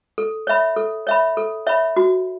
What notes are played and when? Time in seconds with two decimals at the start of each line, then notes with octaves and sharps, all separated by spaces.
0.18 A4
0.47 C#5 E5 B5
0.76 A4
1.07 C#5 E5 B5
1.37 A4
1.67 C#5 E5 B5
1.97 F#4